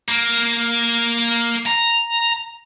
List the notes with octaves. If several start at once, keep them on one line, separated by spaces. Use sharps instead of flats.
A#3
A#5